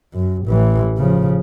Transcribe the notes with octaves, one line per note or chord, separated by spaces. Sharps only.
F#2
A1 E3
C#3 F3